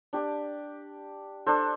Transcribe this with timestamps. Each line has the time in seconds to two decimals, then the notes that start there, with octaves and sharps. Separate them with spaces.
0.13 D4 G4 D5
1.46 D4 A4 C5